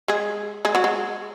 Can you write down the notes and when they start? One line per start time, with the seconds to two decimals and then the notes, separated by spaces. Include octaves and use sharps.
0.08 G#3 G#4
0.65 G#3 G#4
0.75 F#3 F#4
0.84 G#3